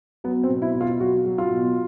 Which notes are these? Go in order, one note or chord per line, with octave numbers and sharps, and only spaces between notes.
F#3 B3
C4
B2
E4
B2
F4
F#3 F#4
F#3
F4
B2